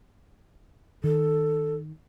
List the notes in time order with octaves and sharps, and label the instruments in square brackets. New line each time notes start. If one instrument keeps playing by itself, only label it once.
[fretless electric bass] D#3 [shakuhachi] A4